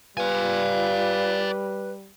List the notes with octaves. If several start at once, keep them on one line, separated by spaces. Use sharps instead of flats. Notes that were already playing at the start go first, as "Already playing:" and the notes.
G3 F4 B4 D5 G#5